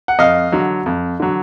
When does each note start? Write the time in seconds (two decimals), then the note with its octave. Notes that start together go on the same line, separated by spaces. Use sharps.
0.08 F#5
0.19 F2 D#5 F5
0.52 D3 F#3
0.86 F2
1.20 D3 F#3